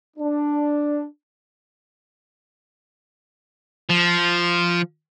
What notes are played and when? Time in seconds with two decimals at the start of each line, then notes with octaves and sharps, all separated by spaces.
0.17 D4
3.90 F3